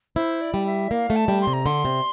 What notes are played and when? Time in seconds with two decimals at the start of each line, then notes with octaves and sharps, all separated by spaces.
0.16 E4 C5
0.41 D5
0.54 G3
0.66 E5
0.91 A#3 F5
1.10 A3
1.16 A5
1.28 G3
1.42 C6
1.47 C3
1.53 A#5
1.66 D3 C6
1.85 C3